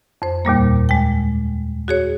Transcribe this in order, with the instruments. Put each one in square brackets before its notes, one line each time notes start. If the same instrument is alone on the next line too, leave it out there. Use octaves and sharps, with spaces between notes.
[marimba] F2 C5
D#2 A#2 G3 A#3
G#3 G5
F#4 G#4 C#5